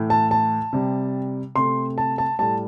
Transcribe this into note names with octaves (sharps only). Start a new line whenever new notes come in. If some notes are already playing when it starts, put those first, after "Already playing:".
Already playing: A2 E3 A3
A5
A5
C3 G3
C3 A3 C6
A5
A5
A2 G3 A5